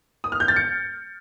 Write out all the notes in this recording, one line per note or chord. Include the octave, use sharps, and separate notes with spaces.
D#6
F6
G6
A6
C#7